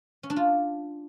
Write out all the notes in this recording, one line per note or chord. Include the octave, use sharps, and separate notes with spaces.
C#4
D4
F4